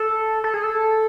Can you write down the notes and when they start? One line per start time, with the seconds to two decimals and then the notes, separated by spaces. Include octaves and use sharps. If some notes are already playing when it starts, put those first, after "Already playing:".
Already playing: A4
0.44 A4
0.54 G#4
0.64 A4